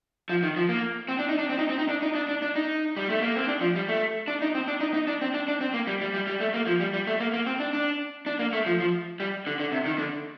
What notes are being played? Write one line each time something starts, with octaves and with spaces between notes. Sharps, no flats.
F3
D#3
F3
A#3
C4
D4
D#4
D4
C4
D#4
C4
D#4
D4
D#4
D4
D4
D4
D#4
G3
A3
A#3
C4
D4
F3
G3
A3
D4
D#4
C4
D4
D#4
D#4
D4
C4
D4
D4
C4
A#3
G3
G3
G3
G3
A3
A#3
F3
G3
G3
A3
A#3
A#3
C4
D4
D4
D4
A#3
A3
F3
F3
G3
D3
D3
C3
D#3
D3